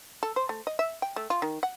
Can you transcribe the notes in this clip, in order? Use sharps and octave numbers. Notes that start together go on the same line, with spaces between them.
A4
C5
A3
D#5
E5
G5
A3
F4
D#3
F#5